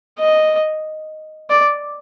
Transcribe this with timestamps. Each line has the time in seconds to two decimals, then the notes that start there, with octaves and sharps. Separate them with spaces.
0.19 D#5
1.50 D5